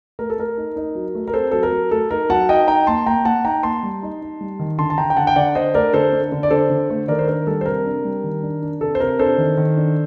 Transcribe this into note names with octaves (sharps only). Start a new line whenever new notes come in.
A3 A#4
A4
A3 A#4
D#4
D#4
F#3
A3
A#4
C4 A4 C5
F#3 A4
A#4
F#3
A3 A4
D#4 A#4
F#3 F#5 A5
D#4 D#5 G5
D#4 G5 A#5
A#3 A5 C6
A#3 G5 A#5
A#3 F#5 A5
D#4 G5 A#5
A#3 A5 C6
G3
D#4
D#4
G3
D#3
D3 A5 C6
A5
D3 G5 A#5
G5
D3 F#5 A5
G5
D3 D5 F#5
D4 C5 D#5
A3 A#4 D5
D3 A4 C5
D4
D3
D5
D3 A4 C5
D3
A3
D#3 A#4 D5
C5
D4 A#4
G3 A4
C5
C3 A#4
D4
G3
D#3
D4
D4
C3 A4
C5
C3 A#4
D4 A4 C5
D#3
D#3
D4